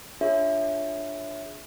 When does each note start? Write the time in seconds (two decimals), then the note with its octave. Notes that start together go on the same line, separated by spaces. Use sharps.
0.21 D4 F4 G#4 C#5 E5